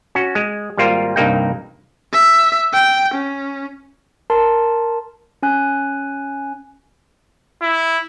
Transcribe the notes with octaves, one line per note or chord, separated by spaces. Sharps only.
C#4 F#4
G#3
G#1 G3 A#3 F4 A#4 C5
C2 G2 A#3 D#4 G5
E5
G5
C#4
A#4 A5 C6
C#4 G#5 F#6
E4